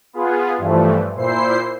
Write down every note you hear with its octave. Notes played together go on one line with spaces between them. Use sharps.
B3 F4 G#4
G2 E3 F3 A3
A#2 E4 C5 C7